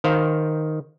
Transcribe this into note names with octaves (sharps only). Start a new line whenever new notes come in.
D#3 C5 F5